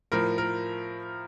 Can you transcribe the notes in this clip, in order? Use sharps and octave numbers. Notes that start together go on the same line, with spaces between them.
A2 F3 A#4
A#4